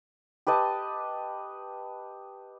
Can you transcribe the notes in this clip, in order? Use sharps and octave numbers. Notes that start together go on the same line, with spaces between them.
G4 B4 D#5 A5